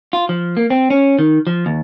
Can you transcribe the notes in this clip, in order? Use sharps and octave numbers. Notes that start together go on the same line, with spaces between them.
F4
F3
A#3
C4
C#4
D#3
F3
D#2